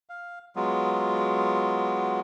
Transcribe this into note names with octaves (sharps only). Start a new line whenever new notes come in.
F5
F#3 G#3 B3 F4